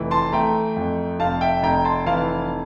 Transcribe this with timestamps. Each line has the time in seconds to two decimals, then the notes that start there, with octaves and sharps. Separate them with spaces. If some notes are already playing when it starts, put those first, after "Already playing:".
Already playing: F1 E3
0.11 A5 C6
0.32 A3 G5 A#5
0.77 F2
1.19 F1 F5 A5
1.41 E5 G5
1.63 F1 G5 A#5
1.85 A5 C6
2.06 E3 F5 A5